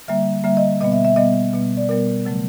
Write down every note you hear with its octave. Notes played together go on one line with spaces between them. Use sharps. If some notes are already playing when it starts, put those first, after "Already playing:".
D3 G3 A#3 E5
D3 G3 A#3 E5
D#5
B2 G3 B3 D#5
E5
E5
B2 G3 B3 D#5
B2 G3 B3
D5
B2 G3 B3 A#4
C#3 F#3 A3